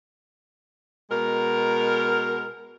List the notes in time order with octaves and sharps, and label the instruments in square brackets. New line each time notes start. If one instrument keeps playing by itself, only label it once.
[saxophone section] B2 G#3 A#4